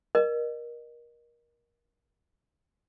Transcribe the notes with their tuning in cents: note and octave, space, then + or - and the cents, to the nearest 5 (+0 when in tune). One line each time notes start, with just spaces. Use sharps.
A#4 +25 D#5 -30